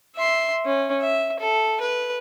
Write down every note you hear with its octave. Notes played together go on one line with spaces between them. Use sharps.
E5 C6
C#4
E5
A4
B4